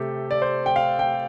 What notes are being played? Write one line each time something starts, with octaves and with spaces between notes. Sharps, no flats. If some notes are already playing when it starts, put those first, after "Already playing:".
Already playing: C3 A3 G4 A4
D5
C5
G5
F5
G5